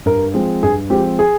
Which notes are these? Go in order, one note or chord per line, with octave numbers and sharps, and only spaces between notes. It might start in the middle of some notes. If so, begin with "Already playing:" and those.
G2 A#4
F3 G#3 C4
G2 G#4
F3 G#3 C4 G4
G#4